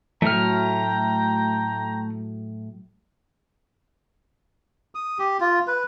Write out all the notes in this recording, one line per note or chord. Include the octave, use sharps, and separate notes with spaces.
A2 F#3 A3 G5 A#5 F6
D#6
G4
F4
B4